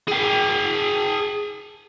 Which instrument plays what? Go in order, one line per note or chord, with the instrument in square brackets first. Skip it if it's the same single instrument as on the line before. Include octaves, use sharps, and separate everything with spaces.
[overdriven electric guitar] G#4 G5